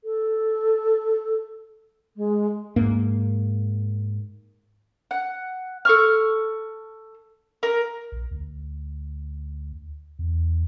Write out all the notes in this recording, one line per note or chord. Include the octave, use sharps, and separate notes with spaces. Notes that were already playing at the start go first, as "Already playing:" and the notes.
A4
G#3
G#2 A#3
F#5
A4 C#6 F6
A#4
A#1
D2
E2